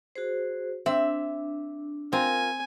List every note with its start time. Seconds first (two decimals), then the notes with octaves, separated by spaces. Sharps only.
0.16 F#4 G#4 C5
0.86 C4 D4 E5 D6
2.13 C4 F4 A#4 G#5